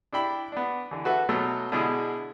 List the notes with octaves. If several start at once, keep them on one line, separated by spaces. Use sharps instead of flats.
D4 E4 G5 B5
B3 D4
D3 E3
F#4 A4 B4 E5
B2 F#3 A3 E6
B2 D3 G#3 E4 G#4